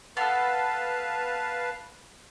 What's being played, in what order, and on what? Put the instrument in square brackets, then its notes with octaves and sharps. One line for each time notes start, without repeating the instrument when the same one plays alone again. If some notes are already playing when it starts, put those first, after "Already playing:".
[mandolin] B3 A4 [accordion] B4 F5 A5